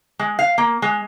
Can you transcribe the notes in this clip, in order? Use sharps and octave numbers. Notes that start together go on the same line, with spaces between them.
G#3
F5
A#3
G#3